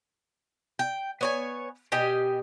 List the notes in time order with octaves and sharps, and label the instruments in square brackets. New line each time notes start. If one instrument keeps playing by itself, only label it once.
[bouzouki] G5
B3 C#5 G#5
B2 G4 D#5 G#5